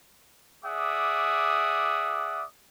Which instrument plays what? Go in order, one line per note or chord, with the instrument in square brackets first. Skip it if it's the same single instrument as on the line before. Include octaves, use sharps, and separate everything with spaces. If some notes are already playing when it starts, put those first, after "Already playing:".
[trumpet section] G#4 D5 E5 F#5 D6 D#6